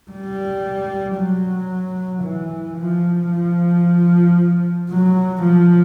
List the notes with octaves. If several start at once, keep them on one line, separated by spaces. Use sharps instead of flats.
G3
F#3
E3
F3
F3
F#3
F3